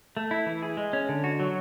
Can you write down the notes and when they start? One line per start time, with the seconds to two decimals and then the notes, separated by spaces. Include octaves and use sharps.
0.17 A3
0.31 E4
0.46 E3
0.62 G#4
0.77 G#3
0.93 C#4
1.09 D3
1.24 F#4
1.40 F#3